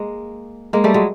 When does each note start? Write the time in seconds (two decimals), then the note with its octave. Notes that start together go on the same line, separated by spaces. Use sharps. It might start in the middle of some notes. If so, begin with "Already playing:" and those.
Already playing: G#3 A#3
0.73 G#3 A#3
0.84 G3 A3
0.94 F#3 G#3